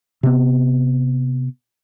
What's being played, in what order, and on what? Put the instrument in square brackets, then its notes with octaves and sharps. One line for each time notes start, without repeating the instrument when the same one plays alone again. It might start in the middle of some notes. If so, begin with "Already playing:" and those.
[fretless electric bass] C3 B3